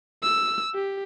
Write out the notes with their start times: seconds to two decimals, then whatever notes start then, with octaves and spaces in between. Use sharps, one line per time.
0.23 E6
0.75 G4